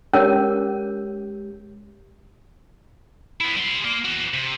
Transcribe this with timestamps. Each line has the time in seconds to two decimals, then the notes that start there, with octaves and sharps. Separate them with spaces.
0.13 G#3 C#4 G4 A#4 C#5 G6
3.41 B3 E4
3.56 G3 C6
3.85 A#3
4.05 E3 F#4
4.34 C3